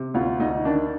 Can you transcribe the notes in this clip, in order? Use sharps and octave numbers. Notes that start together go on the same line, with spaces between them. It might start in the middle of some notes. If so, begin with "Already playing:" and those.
Already playing: C3
D2 F4
D2 D#4
D#3 D4